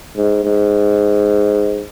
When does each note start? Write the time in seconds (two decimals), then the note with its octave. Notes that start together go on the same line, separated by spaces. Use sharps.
0.17 G#2
0.44 G#2